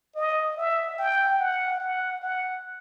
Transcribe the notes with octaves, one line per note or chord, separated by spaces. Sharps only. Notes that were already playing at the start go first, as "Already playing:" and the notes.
D#5
E5
G5
F#5
F#5
F#5